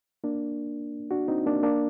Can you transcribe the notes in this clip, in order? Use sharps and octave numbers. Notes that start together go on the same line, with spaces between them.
A#3 D4
D4 F#4
C4 D#4
A#3 D4
A#3 D4